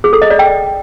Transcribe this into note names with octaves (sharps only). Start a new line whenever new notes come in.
G#4
A4
D#5
D5
G5